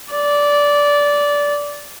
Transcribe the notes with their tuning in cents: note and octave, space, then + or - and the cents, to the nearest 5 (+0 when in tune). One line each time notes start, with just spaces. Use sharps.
D5 -15